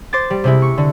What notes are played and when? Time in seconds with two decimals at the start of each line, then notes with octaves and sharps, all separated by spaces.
0.13 C5 D6 A6
0.30 G3
0.44 C3 G#3 E4
0.62 C#6
0.78 D3